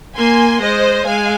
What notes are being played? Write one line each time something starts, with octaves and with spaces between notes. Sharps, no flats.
A#3 G#5 C6
G#3 C5 D#5
G#3 F5 G#5